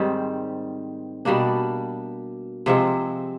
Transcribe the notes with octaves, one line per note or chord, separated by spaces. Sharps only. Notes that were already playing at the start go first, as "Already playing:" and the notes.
Already playing: G#2 D#3 G3 C4
B2 G3 A#3 D4
C3 F3 G#3 C4